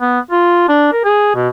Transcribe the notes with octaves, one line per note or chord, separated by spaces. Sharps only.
B3
F4
D4
A#4
G#4
B2